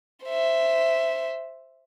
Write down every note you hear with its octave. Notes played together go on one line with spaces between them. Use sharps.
C5 E5